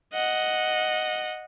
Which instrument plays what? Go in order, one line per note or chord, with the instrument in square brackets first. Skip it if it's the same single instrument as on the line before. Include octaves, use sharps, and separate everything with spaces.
[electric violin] D#5 F#5